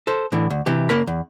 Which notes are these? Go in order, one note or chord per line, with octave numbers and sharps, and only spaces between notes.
A4 C5
A2 D3 E3
D2
C3 E3 G4
C#3 A#3 A#4 B5
E2